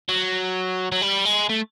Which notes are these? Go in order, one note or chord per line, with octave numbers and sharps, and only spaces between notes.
F#3
F#3
G3
G#3
A3